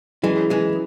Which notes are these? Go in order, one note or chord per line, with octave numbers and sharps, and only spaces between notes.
E3 F#3 G#3 C#4 E4 G#4
E3 G#3